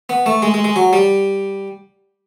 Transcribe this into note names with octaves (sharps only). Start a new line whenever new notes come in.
B3
A3
G#3
G#3
G#3
F#3
G3